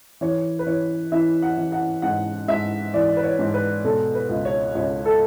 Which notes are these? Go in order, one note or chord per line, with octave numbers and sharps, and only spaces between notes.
E3 C#5
B4
E3 C#5
E3 E5
F#5
E3
F#5
G#2 F#5
G#2 E5
E3 D5
B4
C#5
G#2
B4
B2 A4
B4
C#2
C#5
C#2 C#5
A4